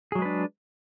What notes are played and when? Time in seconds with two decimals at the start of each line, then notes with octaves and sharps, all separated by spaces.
0.12 G#4
0.15 F#3
0.19 G#3
0.22 B4
0.25 D4